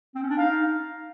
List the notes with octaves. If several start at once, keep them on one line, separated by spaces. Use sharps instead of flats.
C4
C#4
D4
D#4 F5